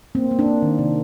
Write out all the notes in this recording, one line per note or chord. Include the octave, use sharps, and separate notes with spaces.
A#3 C4
A#3
D4
A#3
D#3
C3